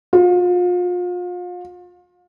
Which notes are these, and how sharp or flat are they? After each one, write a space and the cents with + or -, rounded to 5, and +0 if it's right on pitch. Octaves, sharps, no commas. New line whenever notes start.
F4 +35